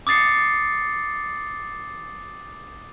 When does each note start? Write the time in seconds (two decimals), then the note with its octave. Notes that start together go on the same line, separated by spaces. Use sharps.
0.07 D6 D#6 A6 C7 C#7